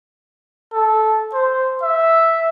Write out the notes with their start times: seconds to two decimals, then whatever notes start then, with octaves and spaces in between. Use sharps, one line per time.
0.72 A4
1.33 C5
1.82 E5